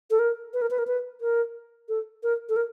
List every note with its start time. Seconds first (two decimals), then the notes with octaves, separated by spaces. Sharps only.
0.11 A4
0.19 A#4
0.53 B4
0.62 A#4
0.71 B4
0.78 A#4
0.87 B4
1.21 A#4
1.89 A4
2.23 A#4
2.49 A4
2.56 A#4